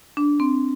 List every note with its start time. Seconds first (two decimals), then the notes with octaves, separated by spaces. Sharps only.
0.17 D4
0.40 C4